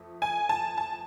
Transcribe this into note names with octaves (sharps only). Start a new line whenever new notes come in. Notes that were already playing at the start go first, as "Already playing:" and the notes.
Already playing: F2 A3
G#5
A5
A5